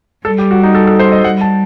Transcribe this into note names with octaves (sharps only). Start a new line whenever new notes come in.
G3 A4
G4
F#4
D#4
A4
A4
C5
D#5
G3 F#5
A5